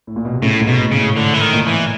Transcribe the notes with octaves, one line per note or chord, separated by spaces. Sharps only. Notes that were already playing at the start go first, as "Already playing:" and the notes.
A2
A#2
B2
C3
A2 C#3
G#2
B2
A2
C#3
A2
A2 D3
E3
D#3
A#2
E3